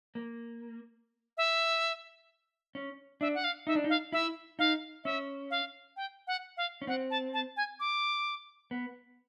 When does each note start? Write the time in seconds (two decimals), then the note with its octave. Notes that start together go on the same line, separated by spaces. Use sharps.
0.15 A#3
1.37 E5
2.75 C#4
3.21 D4 E5
3.35 F#5
3.44 F5
3.67 D#4 E5
3.75 D4
3.84 D#4
3.90 F5
4.12 E4 E5
4.59 D#4 F5
5.04 C#4 E5
5.51 F5
5.97 G5
6.27 F#5
6.57 F5
6.82 C#4
6.87 C4 F#5
7.11 A5
7.34 A5
7.57 G#5
7.80 D6
8.71 B3